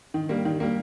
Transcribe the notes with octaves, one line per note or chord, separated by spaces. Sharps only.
D#3
G3 A#3
D#3
G3 A#3